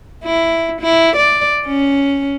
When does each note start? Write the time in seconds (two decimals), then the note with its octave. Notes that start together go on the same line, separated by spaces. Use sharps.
0.24 E4
0.81 E4
1.16 D5
1.66 C#4